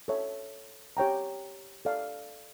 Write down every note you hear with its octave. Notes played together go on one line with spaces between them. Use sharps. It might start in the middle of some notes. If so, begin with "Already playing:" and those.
A4 C#5 E5
G4 C#5 G5 A#5
A4 D5 F5